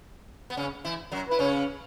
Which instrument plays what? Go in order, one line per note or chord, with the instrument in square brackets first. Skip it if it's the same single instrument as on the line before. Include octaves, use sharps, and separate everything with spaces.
[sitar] B3
C#3 C#4
E3 E4
F#2 F#3
[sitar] E4 [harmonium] B4
[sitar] C#3 C#4 [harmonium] C#5